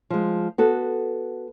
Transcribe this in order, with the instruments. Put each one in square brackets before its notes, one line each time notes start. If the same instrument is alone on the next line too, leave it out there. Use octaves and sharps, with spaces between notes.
[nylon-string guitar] F3 G#3
B3 F#4 A4